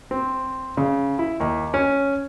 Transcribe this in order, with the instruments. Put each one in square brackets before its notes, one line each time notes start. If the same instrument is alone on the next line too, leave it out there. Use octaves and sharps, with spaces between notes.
[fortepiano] C4
C#3
E4
D#2
C#4